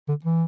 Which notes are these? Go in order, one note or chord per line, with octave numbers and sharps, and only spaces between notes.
D3
E3